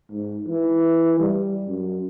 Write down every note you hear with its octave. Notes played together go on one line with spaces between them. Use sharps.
G#2
E3
G3
F#2